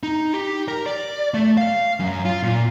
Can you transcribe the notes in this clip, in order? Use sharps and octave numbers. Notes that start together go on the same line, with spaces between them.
D#4
G4
A#4
D5
A3
F5
F#2
F4
A#2